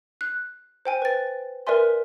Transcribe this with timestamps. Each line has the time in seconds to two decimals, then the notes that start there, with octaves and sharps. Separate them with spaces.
0.21 F#6
0.85 C5 G5 G#5
1.02 B4 A6
1.67 A#4 B4 D5 E5 G#5 C6